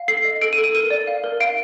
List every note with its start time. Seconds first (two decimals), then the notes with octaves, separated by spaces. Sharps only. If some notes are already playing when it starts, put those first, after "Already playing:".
Already playing: F5
0.08 A4 C7
0.25 D#5
0.42 A4 D7
0.53 D#7
0.58 A4
0.64 D#7
0.75 A#4 D#7
0.90 D5
1.07 F5
1.24 A#4
1.40 F5 D7